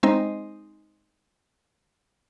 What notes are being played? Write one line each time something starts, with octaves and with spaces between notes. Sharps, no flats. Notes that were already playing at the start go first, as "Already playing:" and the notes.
G#3 C4 D#4 C5 D#5